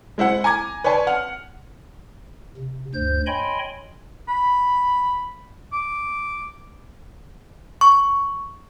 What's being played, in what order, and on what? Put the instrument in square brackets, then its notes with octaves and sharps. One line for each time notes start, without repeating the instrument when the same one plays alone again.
[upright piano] G#3 E4 C5 F#5
G#5 A#5 D6 G#6
B4 C#5 D5 G#5 A5 C6
F#5 F6
[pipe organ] C3
D2 G2 C5 G6
C#5 D#5 G5 G#5 B5 C6
[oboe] B5
D6
[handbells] C#6